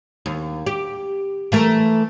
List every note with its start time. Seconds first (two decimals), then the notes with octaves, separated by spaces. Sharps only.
0.26 D#2
0.66 G4
1.52 E3 A3 A#4